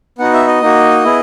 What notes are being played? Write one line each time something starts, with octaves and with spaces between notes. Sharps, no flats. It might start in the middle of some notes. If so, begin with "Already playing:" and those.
B3 D#4 F#4 F#5
E5
D#5
A#3 D#4 F#4
B3 E4 G#4